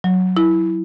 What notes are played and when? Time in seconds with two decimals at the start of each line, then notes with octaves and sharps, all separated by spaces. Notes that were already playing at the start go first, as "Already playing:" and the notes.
0.04 F#3
0.37 E4